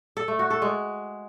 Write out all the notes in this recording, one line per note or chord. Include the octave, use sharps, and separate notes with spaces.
A4
A3
F#4
A4
G#3